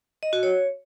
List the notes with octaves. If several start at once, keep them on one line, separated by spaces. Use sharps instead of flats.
D#5
F#4
C#5